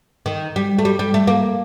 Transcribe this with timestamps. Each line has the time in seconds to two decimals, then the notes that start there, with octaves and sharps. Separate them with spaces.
0.26 D#3
0.56 G3
0.79 A3
0.85 G3
0.99 G3
1.14 A3
1.27 A#3